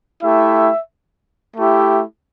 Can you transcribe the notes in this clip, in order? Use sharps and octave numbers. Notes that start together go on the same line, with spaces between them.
A3 E4 G4 E5
A3 E4 G4